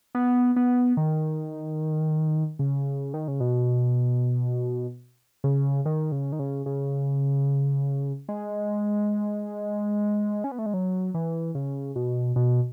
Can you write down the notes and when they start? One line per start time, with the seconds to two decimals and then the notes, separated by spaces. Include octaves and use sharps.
0.15 B3
0.56 B3
0.97 D#3
2.59 C#3
3.14 D#3
3.28 C#3
3.40 B2
5.44 C#3
5.86 D#3
6.12 C#3
6.32 D#3
6.39 C#3
6.66 C#3
8.29 G#3
10.44 C#4
10.52 B3
10.59 A3
10.66 G#3
10.74 F#3
11.14 E3
11.55 C#3
11.96 B2
12.36 B2